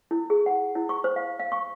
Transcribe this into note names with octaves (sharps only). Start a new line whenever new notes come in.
E4
G#4
F#5
E4
C#6
C5
F5
F5
C#6